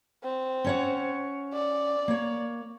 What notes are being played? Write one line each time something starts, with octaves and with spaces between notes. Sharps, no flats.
C4
C#4 C#5 F#5
D5
A#3 C#5